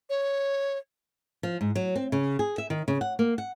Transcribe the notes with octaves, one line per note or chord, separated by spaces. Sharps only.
C#5
F3
G#2
F#3
C4
C#3
G#4
E5
D#3
C#3
F#5
A#3
F#5